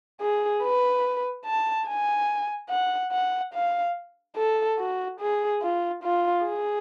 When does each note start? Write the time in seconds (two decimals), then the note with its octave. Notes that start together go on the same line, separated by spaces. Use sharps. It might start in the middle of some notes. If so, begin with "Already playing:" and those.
0.21 G#4
0.63 B4
1.46 A5
1.87 G#5
2.70 F#5
3.12 F#5
3.53 F5
4.37 A4
4.79 F#4
5.20 G#4
5.62 F4
6.03 F4
6.45 G#4